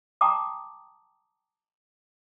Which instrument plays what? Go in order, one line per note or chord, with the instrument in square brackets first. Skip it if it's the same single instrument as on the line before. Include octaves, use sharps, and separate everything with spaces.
[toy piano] G5 A5 A#5 C6 D6 D#6